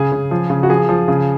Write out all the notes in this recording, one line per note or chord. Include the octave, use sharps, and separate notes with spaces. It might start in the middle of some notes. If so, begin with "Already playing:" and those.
Already playing: C#3 G#4
C#3
F3
C#3
F#4
F3 G#4
F3
C#3